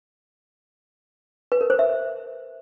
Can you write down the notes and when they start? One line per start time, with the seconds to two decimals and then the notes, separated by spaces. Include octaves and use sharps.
1.52 B4
1.61 A#4
1.70 C5
1.79 E5